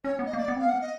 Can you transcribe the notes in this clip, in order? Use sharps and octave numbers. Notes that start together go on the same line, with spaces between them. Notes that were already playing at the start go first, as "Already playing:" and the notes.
C#4 C#5
B3
D#5
A#3
D5
B3
C4 F5
B3
F#5
D#5